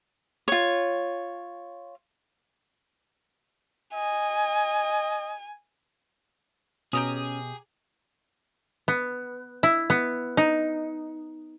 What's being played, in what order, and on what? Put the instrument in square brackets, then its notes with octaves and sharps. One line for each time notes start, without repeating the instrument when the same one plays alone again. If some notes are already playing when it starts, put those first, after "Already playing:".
[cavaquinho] F4 C#5
[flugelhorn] D#5 [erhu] G#5
[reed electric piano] B2 [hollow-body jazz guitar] C#4 [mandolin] G4 A#5 D#6 [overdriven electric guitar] G#4
[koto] B3
E4
B3
D#4